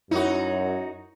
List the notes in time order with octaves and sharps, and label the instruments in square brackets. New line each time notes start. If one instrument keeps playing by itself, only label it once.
[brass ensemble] F#2 [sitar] D#4 F#4 [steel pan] E4 [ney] C#5